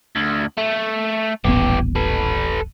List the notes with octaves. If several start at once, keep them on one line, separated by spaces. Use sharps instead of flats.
D2
A3
D#1 A1 E3 B3 G4
A4 B4